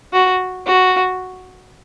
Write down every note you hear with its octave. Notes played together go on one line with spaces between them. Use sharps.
F#4
F#4